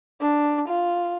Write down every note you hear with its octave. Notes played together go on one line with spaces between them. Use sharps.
D4
F4